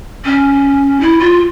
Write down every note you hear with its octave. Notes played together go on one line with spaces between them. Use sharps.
C#4
E4
F4